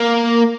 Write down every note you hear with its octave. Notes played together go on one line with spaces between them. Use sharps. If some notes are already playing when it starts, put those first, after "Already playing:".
Already playing: A#3